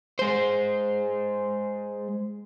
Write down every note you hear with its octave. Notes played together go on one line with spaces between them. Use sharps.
G#3 C5